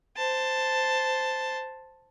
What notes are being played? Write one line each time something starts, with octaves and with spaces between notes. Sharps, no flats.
C5 A5